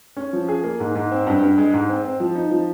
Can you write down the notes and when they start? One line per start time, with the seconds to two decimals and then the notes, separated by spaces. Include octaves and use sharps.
0.16 C#4
0.33 F3
0.48 G#4
0.64 A#3
0.80 G#2
0.95 G#2
1.11 C4
1.27 G2
1.43 G2
1.58 G#3
1.74 G#2
1.89 C4
2.05 C4
2.20 F3
2.35 D#4
2.51 F3